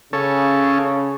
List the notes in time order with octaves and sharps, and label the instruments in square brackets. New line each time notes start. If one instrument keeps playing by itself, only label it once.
[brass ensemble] C#3 [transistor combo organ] C#4 A4